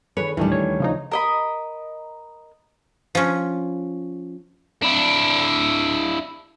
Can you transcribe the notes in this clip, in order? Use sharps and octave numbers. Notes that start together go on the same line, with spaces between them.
D#3 G#4 A4 B4 C#5
D2 A2 D#3 E3 G3 A3 D4
D#2 C#5 G#6
C#3 F3 D#4
A#4 D#5 B5
F3 C#4
D4 E4